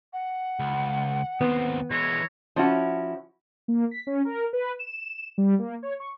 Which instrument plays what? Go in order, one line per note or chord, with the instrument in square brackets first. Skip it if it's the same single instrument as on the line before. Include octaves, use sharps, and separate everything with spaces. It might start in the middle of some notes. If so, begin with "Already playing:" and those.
[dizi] F#5
[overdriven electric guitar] C#2
[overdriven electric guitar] D#2 C4 [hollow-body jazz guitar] B3
[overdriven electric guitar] E3 G#3 [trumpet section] E4 C#5 A#5
[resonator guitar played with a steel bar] F3 C#4 E4 F#4
[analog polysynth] A#3
B6
C#4
A#4
B4
E7
G3
A#3
C#5
C#6